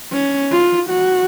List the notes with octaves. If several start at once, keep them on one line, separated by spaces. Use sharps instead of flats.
C#4
F4
F#4